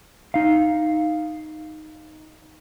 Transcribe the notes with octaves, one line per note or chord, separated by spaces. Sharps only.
D#4 F5